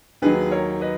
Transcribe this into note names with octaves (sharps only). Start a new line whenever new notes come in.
D#2 D#3 F#3 G#4 B4
A#4 C#5
B4 D#5